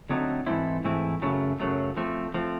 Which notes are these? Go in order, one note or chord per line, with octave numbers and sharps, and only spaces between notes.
D3 F#3 A3 C4 D#4
G#2 E3 A3 C4 E4
G#2 E3 A3 C4 E4
F#2 C#3 F#3 A3
F#2 C#3 F#3 A3
F3 A3 C4
F3 A3 C4